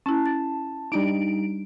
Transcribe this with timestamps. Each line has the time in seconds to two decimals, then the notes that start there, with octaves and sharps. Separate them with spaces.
0.06 C#4 E4 A5
0.26 A6
0.92 G3 D4 D#4 D7